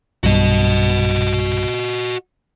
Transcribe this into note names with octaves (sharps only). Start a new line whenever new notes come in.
B1 G2 F#4 D#5